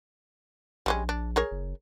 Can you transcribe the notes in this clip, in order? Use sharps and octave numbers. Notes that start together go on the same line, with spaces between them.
A#1 G3 G#3 C#4
D4
G#4 A#4 C#5
F#1